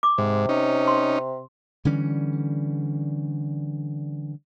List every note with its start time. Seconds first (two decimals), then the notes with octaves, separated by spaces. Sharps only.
0.03 D6
0.18 G#2 C3
0.49 C#4 D#4
0.88 C6
1.85 D3 E3 G3 C#4